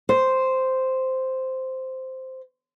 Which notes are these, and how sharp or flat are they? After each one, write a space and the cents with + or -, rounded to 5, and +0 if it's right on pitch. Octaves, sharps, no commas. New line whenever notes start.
C5 -5